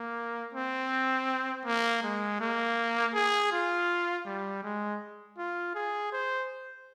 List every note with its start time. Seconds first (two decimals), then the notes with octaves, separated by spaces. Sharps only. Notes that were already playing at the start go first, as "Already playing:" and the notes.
Already playing: A#3
0.54 C4
1.65 A#3
2.03 G#3
2.40 A#3
3.14 G#4
3.52 F4
4.26 G3
4.63 G#3
5.38 F4
5.75 G#4
6.12 C5